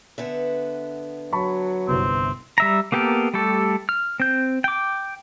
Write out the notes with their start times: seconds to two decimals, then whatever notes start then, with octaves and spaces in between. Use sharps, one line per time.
0.18 D3 B3 E5
1.33 F#3 A5 B5 C#6
1.88 G1 C2 C4 B4
2.58 G3 E5 A#5
2.92 A#3 B3 G4 A4 A#4
3.34 G3 A3 G4 A4
3.89 F6
4.20 C4 G6
4.64 G5 D6